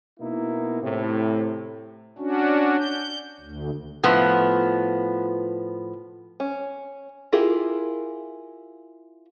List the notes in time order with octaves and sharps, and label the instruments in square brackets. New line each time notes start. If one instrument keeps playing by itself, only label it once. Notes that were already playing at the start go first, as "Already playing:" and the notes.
[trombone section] B2 A#3 D#4 E4
A2 C3
[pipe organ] C#4 D4 F#4
G6
D2
[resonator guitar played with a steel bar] A2 F3 B3
[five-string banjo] C#4
E4 F4 G4 G#4 A#4